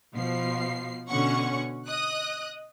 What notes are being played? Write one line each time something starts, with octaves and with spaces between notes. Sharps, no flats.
B2 F3 C7
B2 D3 C#4 F#5 C#6
D#5 D#6 F#6